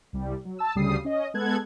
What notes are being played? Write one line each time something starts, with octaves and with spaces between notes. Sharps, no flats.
C2 G3
F#3
A5 E6
D2 C#3 G3 D#6 C7
C#4 D#5
G#3 B3 A4 F#6 G#6